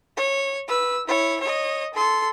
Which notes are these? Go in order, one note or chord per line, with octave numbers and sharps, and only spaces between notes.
C#5
B4 E6
E4 C#5
C#5 D#5
A4 C6